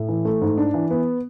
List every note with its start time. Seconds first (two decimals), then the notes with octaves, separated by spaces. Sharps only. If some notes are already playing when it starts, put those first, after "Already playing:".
Already playing: A2
0.09 E3
0.25 A3
0.41 G#2
0.58 D4
0.74 E3
0.91 B3